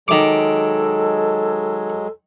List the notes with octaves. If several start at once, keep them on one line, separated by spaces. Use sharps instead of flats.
D#3 F#3 G#3 A4 D6